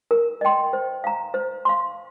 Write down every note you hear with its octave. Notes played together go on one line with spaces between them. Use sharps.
A#4
D#5 G5 C6
C5
F5 A#5
C5
F5 C6